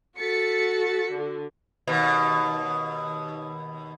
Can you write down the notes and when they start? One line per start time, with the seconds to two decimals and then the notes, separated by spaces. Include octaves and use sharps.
0.18 F#4 A4 A6 B6 C#7
1.13 D3
1.87 D#2 B2